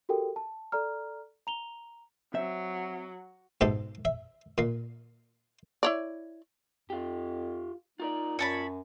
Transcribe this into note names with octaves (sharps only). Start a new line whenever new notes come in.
F#4 G4 A4 A#4 G5
A5
A4 D5 A#5 F6
A#5 F7 G7
F#3 C4 E5
G#2 B2 G4 A4
E5
A#2 A#3
E4 C#5 D5
F2 F4 G4
D#4 F4 A#4 D5
F#2 C#5 A5 B5